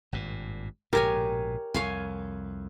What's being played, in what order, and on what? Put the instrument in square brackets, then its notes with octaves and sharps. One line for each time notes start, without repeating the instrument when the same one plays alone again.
[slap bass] G#1 G2 A#2
[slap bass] A#1 G#2 B2 [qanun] G4 C#5 G#5 [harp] A#4
[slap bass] C2 F2 [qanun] C#5 F5 G#5